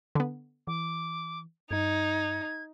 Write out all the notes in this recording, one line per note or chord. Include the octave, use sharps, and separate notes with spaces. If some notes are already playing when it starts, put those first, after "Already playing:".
D3 B3
E3 D6
G2 D#4 G#6